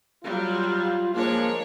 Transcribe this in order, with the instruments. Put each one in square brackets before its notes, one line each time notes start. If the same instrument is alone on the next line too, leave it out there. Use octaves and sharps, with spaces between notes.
[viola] F#3 G3 [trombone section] F4
[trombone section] F3 G#3 A#3 [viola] D4 C#5